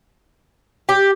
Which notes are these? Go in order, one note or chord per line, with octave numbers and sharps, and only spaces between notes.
G4